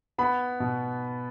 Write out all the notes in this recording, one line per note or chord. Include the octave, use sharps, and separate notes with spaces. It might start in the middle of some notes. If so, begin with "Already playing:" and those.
B3 B5
B2